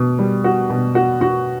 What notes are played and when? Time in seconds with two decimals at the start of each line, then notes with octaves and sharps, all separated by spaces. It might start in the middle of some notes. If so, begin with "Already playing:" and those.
Already playing: B2
0.19 G3
0.44 F#4
0.70 B2
0.95 F#4
1.21 F#4